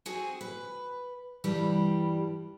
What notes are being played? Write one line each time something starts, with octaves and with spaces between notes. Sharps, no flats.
C4 F#4 G#4 G#5
B4
G2 E3 G3 G4